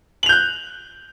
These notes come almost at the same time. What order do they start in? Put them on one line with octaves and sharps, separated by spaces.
F#7 F7 G6 F#6